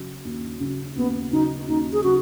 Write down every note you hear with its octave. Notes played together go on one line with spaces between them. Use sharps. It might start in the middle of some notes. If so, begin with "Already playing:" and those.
Already playing: C#3 F#3
D#2
C#3 F#3
D#2 B3
C#3 F#3 D#4
D#2 D#4
G#4
C#3 F#3 F#4